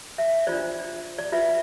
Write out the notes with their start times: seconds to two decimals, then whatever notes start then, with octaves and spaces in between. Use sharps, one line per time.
0.18 E5
0.47 D4 F4 C5 D5
1.18 D5
1.32 F4 B4 E5